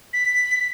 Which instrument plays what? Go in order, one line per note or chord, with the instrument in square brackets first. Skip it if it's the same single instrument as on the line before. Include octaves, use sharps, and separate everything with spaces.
[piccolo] B6